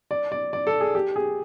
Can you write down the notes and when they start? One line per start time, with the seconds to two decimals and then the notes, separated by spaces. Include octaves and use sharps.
0.11 D5
0.32 D5
0.53 D5
0.67 A4
0.81 G#4
0.95 G4
1.16 G#4